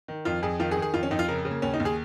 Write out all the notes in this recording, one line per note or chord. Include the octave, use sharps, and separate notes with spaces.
D#3
F2 F4
F2 G#4
D#3 F4
G#4
D#3
G#4
F2 F4
C#4
F2 D#4
F4
C#3 A#4
C#3
A#3
D#2 C#4
D#4
D#2
G#4